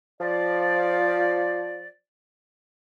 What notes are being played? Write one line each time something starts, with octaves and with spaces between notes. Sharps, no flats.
F3 D5